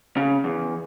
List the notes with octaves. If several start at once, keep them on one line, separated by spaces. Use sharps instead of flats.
C#3
E2